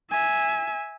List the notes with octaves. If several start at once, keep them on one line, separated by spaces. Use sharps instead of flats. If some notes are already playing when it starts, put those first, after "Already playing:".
E5 G#5